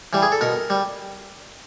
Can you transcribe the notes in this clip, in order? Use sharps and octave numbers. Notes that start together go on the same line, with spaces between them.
E3 G3
G#4
A4
B2 A#4
G3